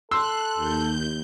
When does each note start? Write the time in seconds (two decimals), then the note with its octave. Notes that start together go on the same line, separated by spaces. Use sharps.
0.11 A4 C6 E6 F#6
0.55 D#2 G6